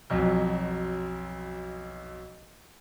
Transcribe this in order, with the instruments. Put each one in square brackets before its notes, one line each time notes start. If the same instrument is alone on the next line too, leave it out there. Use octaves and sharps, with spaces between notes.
[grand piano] B1 F2 F#3